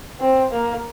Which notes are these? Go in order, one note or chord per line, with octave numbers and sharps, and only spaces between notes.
C4
A#3